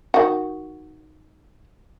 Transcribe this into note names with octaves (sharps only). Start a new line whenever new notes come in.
D#3 F#4